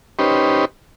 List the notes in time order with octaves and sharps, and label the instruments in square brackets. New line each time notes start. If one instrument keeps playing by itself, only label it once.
[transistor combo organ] C#4 D#4 G4 B4 C5